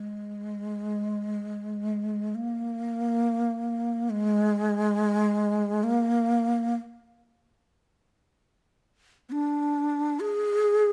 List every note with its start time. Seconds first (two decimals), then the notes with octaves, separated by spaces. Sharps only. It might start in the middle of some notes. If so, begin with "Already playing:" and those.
Already playing: G#3
2.35 A#3
4.10 G#3
5.83 A#3
9.29 B3
9.32 D4
10.20 G#4